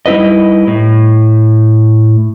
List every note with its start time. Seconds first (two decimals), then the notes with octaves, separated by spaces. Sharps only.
0.06 G3 D#4 E4 B4 D#5
0.67 A2